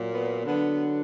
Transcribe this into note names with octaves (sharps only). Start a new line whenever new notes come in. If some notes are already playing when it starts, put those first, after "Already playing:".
Already playing: A#2 F#3
B3
D3 F#3 B3